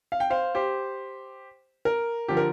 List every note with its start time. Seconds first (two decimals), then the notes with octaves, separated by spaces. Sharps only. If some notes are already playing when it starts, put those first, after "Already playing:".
0.12 F5
0.20 G5
0.30 C5 F5
0.55 G4 C5
1.85 A#4
2.28 D3 F3 G4
2.37 A#4